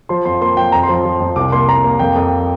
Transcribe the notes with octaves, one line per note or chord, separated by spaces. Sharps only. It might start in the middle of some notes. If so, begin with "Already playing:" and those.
F3 C6
F2 C6
A#3 C6
F3 G5
F2 A#5
C6
F3
C6
F3
F2
C2 D6
A#3 C6
A#3 A#5
A#3
F2 G5
F2